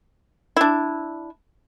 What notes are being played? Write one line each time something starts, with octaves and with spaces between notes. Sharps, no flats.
D4 E4